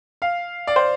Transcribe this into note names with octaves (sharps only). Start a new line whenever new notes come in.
F5
D5
C5